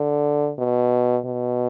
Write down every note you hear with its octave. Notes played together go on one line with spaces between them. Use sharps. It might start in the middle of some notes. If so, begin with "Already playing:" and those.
Already playing: D3
B2
B2